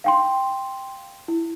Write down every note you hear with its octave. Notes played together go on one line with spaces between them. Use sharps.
F5 G5 C6
E4